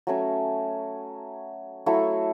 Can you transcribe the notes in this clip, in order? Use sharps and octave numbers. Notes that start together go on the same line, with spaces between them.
F#3 A3 C#4
F#3 A3 E4